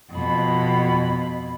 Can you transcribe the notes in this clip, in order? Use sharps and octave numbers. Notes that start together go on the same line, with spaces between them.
F2 B2 B5